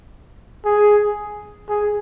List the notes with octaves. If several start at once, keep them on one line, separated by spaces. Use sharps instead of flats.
G#4
G#4